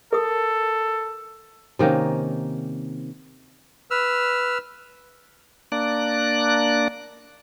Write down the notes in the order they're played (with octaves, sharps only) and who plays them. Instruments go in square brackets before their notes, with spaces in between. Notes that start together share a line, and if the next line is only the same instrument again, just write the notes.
[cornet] A4 [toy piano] A#4 D#6
[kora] C3 D#3 A#3 C#4
[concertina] B4 E6 F6
[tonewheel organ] A#3 D4 D5 F#6